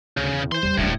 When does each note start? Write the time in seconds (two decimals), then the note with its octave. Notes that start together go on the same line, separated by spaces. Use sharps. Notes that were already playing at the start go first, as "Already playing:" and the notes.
0.17 D2 C#3
0.33 E2
0.52 E3 C5 C6
0.63 E2 G3
0.77 D#1 D2 A2 D4